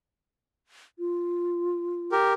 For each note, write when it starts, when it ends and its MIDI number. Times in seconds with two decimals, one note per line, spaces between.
0.99 2.13 65
2.12 2.33 67
2.12 2.33 70